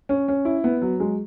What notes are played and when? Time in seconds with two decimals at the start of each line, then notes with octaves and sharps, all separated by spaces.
0.09 C#4
0.28 C#4
0.45 E4
0.64 B3
0.82 F#3
1.00 G#3